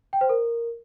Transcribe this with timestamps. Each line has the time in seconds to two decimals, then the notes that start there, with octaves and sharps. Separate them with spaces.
0.13 G5
0.21 C5
0.29 A#4